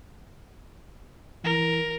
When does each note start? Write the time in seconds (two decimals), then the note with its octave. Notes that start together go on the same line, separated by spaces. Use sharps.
1.44 E3 A#4